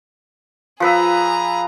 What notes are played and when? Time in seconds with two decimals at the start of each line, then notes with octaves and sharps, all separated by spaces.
0.80 F3 G#4 B4 A#5 E6